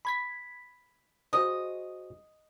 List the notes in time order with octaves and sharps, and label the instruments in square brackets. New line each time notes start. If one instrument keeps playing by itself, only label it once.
[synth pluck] B5 G#6 B6
[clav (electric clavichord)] F#4 G#4 C5 [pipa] D#5